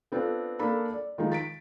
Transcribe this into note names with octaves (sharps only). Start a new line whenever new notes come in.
B3 C4 D4 F4 A4
A#3 D4 A4 B5
D5
D#3 F3 G#3 D#4
A6 B6 D7